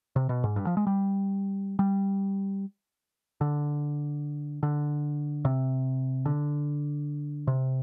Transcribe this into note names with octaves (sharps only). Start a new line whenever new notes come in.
C3
B2
G#2
G2
F3
G#3
G3
G3
D3
D3
C3
D3
C3